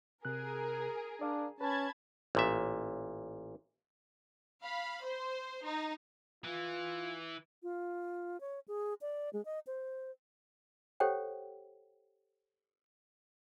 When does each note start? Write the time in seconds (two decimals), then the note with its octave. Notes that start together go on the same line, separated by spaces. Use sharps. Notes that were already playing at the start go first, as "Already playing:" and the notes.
0.25 C3 G#4 A#4 F#6
1.21 D4 D5 F5
1.61 C#4 B4 A5 B5 G#6
2.35 A1 A#2 E5
4.62 F5 B5
5.03 C5
5.64 D#4
6.44 E3 F4
7.63 F4
8.41 C#5
8.68 G#4
9.01 D5
9.33 G#3
9.45 D#5
9.67 C5
11.00 G4 A4 C5 C#5 F#5 G5